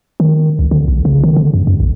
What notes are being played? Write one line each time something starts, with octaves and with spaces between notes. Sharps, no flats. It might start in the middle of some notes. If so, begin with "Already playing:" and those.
D#3
C#2
D3
B1
C#3
D#3
D3
F#2
F#2
A#1